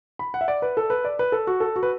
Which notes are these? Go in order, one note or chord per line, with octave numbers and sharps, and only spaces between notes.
B5
F#5
E5
D5
B4
A4
B4
D5
B4
A4
F#4
A4
F#4
B4